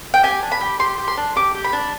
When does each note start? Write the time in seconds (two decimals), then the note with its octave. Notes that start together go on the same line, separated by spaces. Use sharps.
0.14 G5
0.23 G4 G#5
0.43 D4
0.52 B5
0.61 G4
0.79 G4 C6
0.98 G4
1.08 C6
1.17 D4
1.36 G4 D6
1.55 G4
1.64 B5
1.73 D4